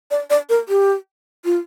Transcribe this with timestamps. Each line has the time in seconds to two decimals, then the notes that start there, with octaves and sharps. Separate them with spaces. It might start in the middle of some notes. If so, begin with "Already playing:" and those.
0.11 D5
0.30 D5
0.49 A#4
0.69 G4
1.45 F4